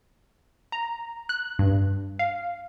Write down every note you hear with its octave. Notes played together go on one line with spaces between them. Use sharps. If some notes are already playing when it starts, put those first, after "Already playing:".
A#5
F#6
G2
F5